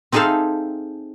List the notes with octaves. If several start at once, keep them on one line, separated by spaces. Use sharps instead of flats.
C4 D#4 G#4 A4 E5 F5